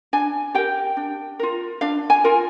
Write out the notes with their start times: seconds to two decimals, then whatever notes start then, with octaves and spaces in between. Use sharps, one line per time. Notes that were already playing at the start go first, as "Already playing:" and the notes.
0.13 D4 G#5
0.54 G4 A#4 G5
0.97 D4
1.39 F4 A#4
1.81 D4 F5
2.10 G#5
2.24 F4 A#4